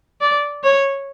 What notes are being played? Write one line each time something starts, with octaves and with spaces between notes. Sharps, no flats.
D5
C#5